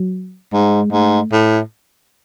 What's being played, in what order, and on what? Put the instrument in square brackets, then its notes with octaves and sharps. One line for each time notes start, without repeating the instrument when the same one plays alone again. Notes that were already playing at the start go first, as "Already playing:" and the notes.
Already playing: [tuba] F#3
[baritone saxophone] G#2 [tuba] G#3
[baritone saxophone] G#2 [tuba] A3
[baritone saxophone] A2